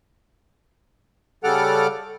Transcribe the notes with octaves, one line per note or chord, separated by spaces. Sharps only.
C#3 G3 A4 F#5 D6 F6